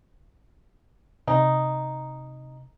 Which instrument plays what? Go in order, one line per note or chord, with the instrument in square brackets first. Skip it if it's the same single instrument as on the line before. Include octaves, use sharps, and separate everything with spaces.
[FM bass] C3 [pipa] D#4